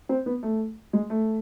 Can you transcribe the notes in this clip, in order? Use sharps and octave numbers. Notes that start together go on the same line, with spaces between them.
C4
B3
A3
G#3
A3